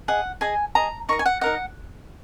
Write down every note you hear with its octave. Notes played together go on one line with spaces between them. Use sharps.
G#4 D#5 F#5
G#4 D#5 G#5
G#4 D#5 A#5
D#4 A#4 D#5 C#6
G#5
F#5
D#4 A#4 D#5 F#5